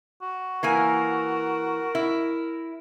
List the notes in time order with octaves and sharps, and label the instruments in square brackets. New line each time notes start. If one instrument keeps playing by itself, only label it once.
[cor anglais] F#4
[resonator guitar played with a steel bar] E3 A#3 G#5 [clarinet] A#4
[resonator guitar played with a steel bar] E4